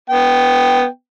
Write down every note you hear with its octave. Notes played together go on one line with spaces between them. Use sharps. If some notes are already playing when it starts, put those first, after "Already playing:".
B3 G5